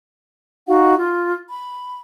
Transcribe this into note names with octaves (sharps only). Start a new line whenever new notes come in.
D#4 F#4 F5 F#5
F4
B5